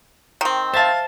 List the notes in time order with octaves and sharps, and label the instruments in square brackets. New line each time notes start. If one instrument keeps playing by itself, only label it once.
[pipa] D#3 C4
[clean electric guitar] C5 E5 A5 [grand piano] F5 A6